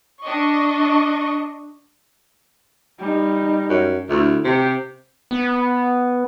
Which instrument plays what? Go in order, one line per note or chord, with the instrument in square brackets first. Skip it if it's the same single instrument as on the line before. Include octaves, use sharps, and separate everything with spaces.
[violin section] D4 D#5 C#6
[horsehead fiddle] G3 D#4
[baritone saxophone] F#2
[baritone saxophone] D2 [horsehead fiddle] E4
[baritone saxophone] C3 [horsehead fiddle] G4
[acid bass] B3